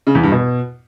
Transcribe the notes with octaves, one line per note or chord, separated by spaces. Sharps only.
C#3
E2
G2
B2